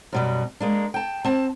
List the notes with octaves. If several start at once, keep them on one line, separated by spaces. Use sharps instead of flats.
F#2 B2 G3
G#3 A#3 D4
G5 A5
C4 A5